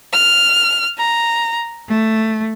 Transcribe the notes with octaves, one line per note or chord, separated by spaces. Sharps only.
F6
A#5
A3